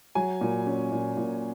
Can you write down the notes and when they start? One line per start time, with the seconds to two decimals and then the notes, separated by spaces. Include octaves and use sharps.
0.15 F#3 G#5
0.41 A#2
0.66 C#4
0.92 A#2
1.17 A#2